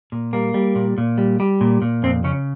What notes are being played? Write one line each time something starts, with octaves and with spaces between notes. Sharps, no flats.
A#2
G3 A#3
G3
A#2
A#2
G3
G3
A#2
A#2
F2 C4
C#3 C#4